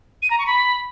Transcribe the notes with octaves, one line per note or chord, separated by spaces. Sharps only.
D#7
A#5
C#6
B5